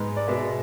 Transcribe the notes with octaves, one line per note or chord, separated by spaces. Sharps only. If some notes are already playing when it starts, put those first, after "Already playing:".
Already playing: G#2 G#3 B3
D5
B2 G#3 B3 E5